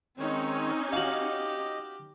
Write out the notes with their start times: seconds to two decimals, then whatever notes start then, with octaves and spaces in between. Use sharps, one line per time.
0.19 D#3 G#3 C4 C#4 D#4 C#5
0.93 F#4 G4 D#5 F5